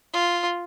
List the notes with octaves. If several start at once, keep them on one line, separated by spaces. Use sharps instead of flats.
F4